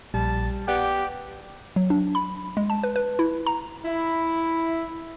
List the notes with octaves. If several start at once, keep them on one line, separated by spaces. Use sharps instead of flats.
A#1 G3 A5
B3 G4 D5 F#5
F#3
D4
B5
G#3
A5
B4
B4
E4
A#5
E4